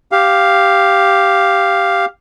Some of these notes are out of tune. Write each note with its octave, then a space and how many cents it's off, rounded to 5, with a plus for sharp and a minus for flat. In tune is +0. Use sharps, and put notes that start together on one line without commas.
G4 +0 F5 +0